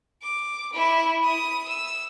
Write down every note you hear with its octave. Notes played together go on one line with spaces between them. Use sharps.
D6
E4
D#6
E6